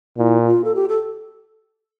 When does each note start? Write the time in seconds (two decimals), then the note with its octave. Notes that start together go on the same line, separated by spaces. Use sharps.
0.18 A#2 E4
0.47 F4
0.64 A4
0.75 G4
0.89 A4